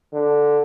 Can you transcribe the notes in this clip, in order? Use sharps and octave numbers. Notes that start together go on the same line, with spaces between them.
D3